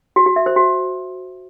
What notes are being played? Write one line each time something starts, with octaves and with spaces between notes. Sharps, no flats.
F#4
F#4
E5
C5
F#4